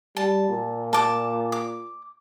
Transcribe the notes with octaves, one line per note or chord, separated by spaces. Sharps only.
G3 A5
A#2
A5 D6
D6